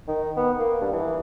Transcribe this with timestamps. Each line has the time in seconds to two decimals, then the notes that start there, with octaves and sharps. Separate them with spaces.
0.08 D#3
0.36 B3
0.59 A#3
0.81 G2
0.93 E3